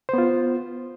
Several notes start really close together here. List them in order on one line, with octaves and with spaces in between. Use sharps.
C5 B3 F4